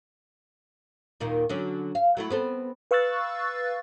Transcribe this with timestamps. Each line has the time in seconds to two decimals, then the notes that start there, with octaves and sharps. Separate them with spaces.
1.20 D#2 A#2 D#3
1.49 D3 F#3 C#4
1.95 F5
2.17 F#3 A3 E4
2.30 B3 C4 A4
2.91 B4 F5 C#6 E6 F#6 A6